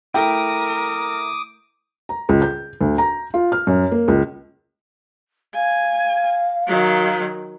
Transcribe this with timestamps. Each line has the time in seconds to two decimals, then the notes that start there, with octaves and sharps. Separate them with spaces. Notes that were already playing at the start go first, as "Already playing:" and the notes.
0.14 A3 E4 A#4 G5 D6 D#6
2.09 A#5
2.29 C#2
2.42 G6
2.81 D2
2.98 A#5
3.34 F4
3.52 F6
3.67 F#2
3.91 A#3
4.08 C#2
5.54 F5 G#5
6.67 D#3 F#3